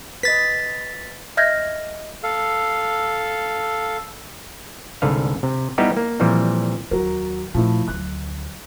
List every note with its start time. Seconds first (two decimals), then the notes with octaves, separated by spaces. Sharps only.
0.23 B4 D#5 A6 B6
1.37 D#5 E5 F6 G6 G#6 A#6
2.23 A4 F5
5.02 C2 G#2 D3 A4 B4 F5
5.43 C3
5.78 G3 B3 D#4 E4 G4
5.97 A#3
6.20 A#2 E3 F3 G3 C4
6.91 D#2 F#3 A#4
7.54 A#2 F3 A3 E4
7.88 D2 F#3 F#6